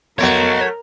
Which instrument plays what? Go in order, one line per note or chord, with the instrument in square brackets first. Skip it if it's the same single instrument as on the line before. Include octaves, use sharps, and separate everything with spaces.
[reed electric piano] F2 B3 C6 [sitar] F#3 A3 [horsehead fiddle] A#4 [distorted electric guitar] C#5 D#5